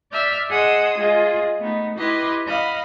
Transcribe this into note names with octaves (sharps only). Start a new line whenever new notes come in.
D5 E5 F6 G6
G#4 D#5 F#5 C6 D#6 E6
G#3 F4 G#4 D#5
A3 B3 D#4
E4 G4 B4 D#5 C6
D#5 F5 F#5 B5